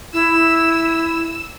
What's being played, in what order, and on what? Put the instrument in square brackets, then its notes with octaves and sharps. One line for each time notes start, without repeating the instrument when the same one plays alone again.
[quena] E4 [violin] E6